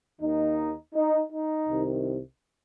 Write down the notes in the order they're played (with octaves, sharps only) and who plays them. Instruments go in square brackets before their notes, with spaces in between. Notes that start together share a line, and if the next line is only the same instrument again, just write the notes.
[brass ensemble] D#2 D#3 A#3 D#4
D#4
D#4
C2 C3 D#3